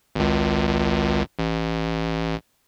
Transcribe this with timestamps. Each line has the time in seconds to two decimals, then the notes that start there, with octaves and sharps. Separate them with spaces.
0.15 G#1 C#2
1.39 A1